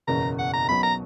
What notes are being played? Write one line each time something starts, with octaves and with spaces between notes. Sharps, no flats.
F#1 E2 B2 A#3 C#4 A#5
F#5
A#5
B1 B2 F#3 C#4 B5
A#5